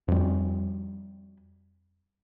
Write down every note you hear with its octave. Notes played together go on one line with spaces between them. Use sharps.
F2 G3